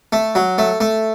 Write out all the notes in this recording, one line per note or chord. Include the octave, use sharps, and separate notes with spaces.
A3
F#3
A3
A3